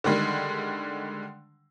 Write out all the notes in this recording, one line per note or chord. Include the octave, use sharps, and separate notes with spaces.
D3 D#3 G3 G#3